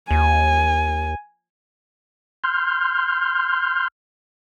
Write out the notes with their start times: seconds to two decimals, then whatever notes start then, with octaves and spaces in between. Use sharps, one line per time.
0.11 D#2 G#5
2.44 C6 F6 G6